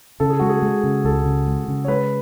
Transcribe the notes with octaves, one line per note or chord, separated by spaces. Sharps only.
C#3 A4
G#4
G#3 F#4
G#4
G#3
C#3
C#2 A4
C#3
G#3
C#3
C#5
G#3 B4